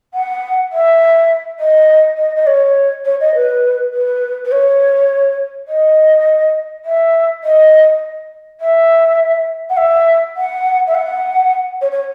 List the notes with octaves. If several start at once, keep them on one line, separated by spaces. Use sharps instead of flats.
F#5
E5
D#5
D#5
D#5
C#5
C#5
D#5
B4
B4
B4
C#5
D#5
E5
D#5
E5
F#5
E5
F#5
E5
F#5
C#5
C#5